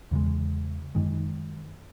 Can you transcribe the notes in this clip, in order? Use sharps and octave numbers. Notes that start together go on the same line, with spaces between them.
E2 C#3 G#3
F#2 D#3 G#3